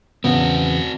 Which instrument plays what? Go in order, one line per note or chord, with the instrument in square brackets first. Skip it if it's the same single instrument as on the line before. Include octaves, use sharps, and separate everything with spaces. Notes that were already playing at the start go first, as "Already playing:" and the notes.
[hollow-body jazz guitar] E2 C#3 B3 [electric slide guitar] C4 F#4